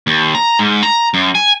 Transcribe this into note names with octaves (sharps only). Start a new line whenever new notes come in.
D#2
A#5
G#2
A#5
F#2
G#5